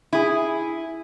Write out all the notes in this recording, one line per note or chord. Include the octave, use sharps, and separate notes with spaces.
E4 G#4